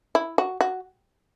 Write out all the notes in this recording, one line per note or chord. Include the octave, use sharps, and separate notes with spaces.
E4
F#4
F#4